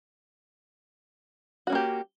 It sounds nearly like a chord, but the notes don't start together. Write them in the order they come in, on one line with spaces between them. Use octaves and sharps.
F#4 C#4 A#3 G4